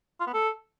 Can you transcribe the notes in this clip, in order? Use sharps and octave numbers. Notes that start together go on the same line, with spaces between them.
F4
B3
A4